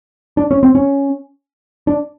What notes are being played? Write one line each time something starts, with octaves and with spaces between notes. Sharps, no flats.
D4
C#4
C4
C#4
D4